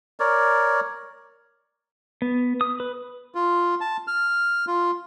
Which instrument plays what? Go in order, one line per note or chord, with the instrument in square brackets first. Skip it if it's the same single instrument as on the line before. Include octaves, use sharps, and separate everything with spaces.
[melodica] A#4 C#5 D5
[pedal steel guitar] B3
D#6
B4
[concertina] F4
A5
F6
F4